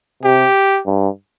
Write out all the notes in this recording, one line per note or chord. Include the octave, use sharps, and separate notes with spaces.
C3 G4
G2